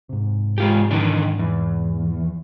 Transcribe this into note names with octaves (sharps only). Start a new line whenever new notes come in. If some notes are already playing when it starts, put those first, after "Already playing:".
G#2 C3
G#3 F4 G4
D#3 E3 D4
E2